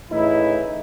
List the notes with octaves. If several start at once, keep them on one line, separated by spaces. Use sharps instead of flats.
A2 C#3 E3 D#4 E4